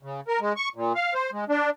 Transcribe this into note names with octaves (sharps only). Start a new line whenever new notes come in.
C#3
A#4
G#3
C#6
A#2
F5
C5
G#3
D4